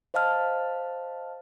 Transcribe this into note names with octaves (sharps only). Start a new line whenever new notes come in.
C5 D#5 F5 A5 F6